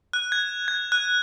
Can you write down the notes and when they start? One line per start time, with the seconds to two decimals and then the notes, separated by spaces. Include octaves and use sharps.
0.13 F#6
0.32 G#6
0.68 G#6
0.92 F#6